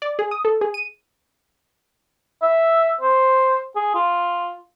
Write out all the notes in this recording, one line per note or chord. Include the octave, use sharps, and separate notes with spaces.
D5
G#4
D#6
A4
G#4
D#7
E5
C5
G#4
F4